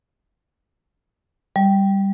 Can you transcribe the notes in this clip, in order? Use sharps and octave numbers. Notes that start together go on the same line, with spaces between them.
G3